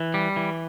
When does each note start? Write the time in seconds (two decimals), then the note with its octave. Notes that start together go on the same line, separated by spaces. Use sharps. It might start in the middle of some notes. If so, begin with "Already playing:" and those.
Already playing: E3
0.14 G3
0.37 E3